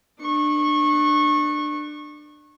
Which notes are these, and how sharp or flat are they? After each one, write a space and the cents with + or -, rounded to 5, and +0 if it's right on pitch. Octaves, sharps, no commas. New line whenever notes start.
D4 +25 C#6 -25